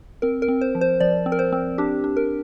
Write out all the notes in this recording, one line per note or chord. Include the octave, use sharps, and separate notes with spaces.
C4 A#4
A#4
C4
C5
F3
C5
F3 D5
C4
A#4
C5
C4
D4 G4
D4
A#4